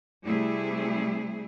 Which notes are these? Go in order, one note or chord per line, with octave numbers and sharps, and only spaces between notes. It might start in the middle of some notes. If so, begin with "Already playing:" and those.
C3 G3 A3 E4 G#4